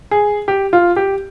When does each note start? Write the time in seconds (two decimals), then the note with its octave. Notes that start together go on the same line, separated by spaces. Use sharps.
0.11 G#4
0.48 G4
0.73 F4
0.96 G4